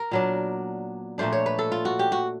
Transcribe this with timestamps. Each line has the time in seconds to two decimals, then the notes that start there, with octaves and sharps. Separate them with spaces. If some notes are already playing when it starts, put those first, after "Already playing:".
Already playing: A#4
0.11 A#2 F#3 B3 D4
1.18 A#2 F3 A3 D4 C5
1.32 C#5
1.46 B4
1.59 A4
1.72 F4
1.85 F#4
1.99 G4
2.12 F#4